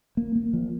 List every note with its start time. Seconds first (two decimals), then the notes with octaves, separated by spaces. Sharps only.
0.17 A#3
0.36 A#3
0.53 F3